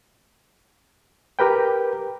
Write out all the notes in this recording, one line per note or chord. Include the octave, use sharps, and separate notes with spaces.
G4 A#4 B4 G5